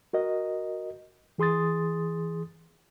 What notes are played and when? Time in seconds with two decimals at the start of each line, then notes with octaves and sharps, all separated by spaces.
0.13 F#4 A#4 D#5
1.38 E3 G#4 C6 D#6 A6